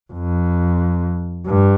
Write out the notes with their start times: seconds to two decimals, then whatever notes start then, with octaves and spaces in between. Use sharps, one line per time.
0.12 F2
1.46 G2